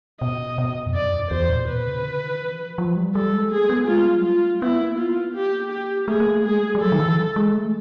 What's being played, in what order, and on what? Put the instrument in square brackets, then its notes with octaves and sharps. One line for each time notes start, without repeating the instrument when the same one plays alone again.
[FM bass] B2 [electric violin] D#5
[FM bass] B2
F2
[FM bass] F#2 [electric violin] D5
[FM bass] E2
[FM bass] E2 [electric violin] C5
[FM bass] A#2
[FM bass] B2 [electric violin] B4
[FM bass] C#3
D3
D#3
E3
F3
F3
G3
[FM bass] G3 [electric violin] A4
[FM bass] G#3
[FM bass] A#3 [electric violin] G#4
[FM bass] B3
[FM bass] G#3 [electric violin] F4
[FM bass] G3
F#3
[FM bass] G3 [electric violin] F4
[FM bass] G#3
A3
[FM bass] B3 [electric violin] E4
[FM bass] A#3
[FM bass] B3 [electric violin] F4
[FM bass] A#3
[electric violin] G4
G4
[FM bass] A3 [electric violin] G#4
[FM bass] A#3
A3
[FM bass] G#3 [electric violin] G#4
[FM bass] G3
G3
[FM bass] F#3 [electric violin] A4
[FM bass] D#3
E3
G#3
A3